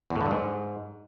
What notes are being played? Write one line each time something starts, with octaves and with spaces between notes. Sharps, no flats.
E2
A2
D3
G2
G#2